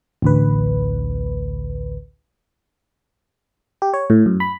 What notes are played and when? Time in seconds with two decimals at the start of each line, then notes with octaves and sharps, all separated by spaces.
0.22 A1 D2 B4
3.82 G4
3.94 C#5
4.10 A2
4.26 F#2
4.40 B5